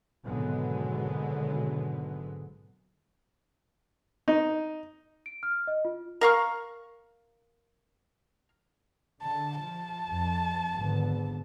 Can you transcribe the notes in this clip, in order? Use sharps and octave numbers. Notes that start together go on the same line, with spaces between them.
G#1 B2 D3 F#3 G#3 B3
D#4
D7
F6
D#5
F4
A#4 F5 C#6
D3 A5
F3 A5
F2
G#1 D3 B3